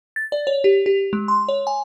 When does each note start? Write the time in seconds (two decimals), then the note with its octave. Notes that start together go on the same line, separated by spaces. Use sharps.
0.16 A6
0.32 D5
0.47 C#5
0.64 G4
0.86 G4
1.13 G#3
1.28 C6
1.49 C#5
1.67 G#5